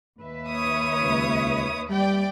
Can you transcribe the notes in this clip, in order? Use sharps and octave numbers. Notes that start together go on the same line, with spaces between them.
D#2 B4 E5
C#5 D#6
C#2
G3 D5 G5